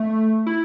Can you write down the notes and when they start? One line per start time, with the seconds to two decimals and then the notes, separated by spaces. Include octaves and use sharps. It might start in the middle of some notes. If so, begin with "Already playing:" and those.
Already playing: A3
0.47 E4